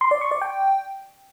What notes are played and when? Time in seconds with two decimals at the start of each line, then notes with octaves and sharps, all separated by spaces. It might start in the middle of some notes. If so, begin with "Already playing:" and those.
0.01 C6
0.11 D5
0.21 C#6
0.31 D5
0.41 G5